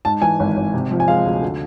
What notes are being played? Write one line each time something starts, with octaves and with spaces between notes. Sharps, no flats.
G#2 A5
E3 G#5
G#1
G#1
C3
F3
G#5
G#3 F5
D2
D3